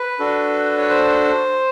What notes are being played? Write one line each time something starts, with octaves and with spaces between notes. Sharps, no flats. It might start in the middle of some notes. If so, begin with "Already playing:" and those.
Already playing: B4
D4 F#4 A4
C#5
C5